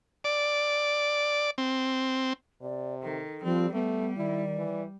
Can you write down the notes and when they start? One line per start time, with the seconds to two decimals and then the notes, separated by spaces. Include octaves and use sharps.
0.24 D5
1.58 C4
2.62 C3 D5
3.03 D#3 A4
3.44 F3 G3 C4
3.74 G3 A3 B3
4.18 D#3 E4 D5
4.58 E3